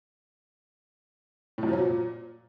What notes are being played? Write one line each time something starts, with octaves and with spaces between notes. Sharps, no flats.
A2
F#2
F3
F#3
A#2